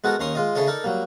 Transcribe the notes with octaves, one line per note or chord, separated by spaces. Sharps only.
G#3 B3 F#4 A4 A#4
D#2 C#4 A#5 C6 C#6 D#6
G#3 F4 D#5
C#3 E4 G#4 A4 C#5 D#5
D#4 A4 A#4 D5
F#3 G3 A#3